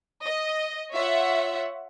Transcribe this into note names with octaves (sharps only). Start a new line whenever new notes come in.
D#5
F4 C#5 E5 F#5